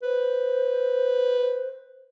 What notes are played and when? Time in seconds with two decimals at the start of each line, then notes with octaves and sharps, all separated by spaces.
0.03 B4 C5